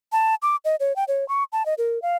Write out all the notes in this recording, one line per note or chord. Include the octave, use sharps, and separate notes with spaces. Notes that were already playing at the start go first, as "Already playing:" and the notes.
A5
D6
D#5
C#5
G5
C#5
C#6
A5
D#5
A#4
F5